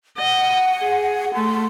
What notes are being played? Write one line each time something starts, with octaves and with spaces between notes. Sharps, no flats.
D#5 F#5
G#4
A3 C6